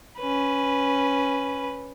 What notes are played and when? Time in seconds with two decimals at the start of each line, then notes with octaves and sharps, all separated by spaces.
0.19 C#4 B4